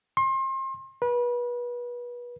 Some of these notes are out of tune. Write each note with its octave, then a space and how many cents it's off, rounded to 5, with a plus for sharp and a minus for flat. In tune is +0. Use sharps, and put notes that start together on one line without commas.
C6 +35
B4 -30